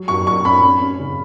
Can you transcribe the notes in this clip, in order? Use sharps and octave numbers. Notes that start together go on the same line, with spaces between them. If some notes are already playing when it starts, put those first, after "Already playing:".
Already playing: F#3
F#2 C#6
F#2 C#6
C#4 B5
C#4
C#4
C#3